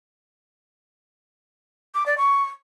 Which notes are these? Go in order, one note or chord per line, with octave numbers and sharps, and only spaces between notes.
D6
D5
C#6